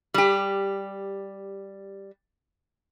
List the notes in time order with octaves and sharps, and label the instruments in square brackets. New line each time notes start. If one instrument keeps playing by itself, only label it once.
[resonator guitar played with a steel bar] G3 G4